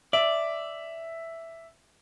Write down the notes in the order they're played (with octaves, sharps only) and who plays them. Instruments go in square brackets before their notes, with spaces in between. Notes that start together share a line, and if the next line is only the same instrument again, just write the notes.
[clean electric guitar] D5 [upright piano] E5